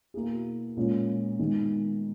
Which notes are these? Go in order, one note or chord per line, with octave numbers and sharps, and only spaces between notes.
B2 A#3 E4 G#4
A#2 G#3 C#4
D#3 G#3 B3